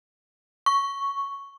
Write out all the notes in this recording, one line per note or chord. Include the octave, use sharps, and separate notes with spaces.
C#6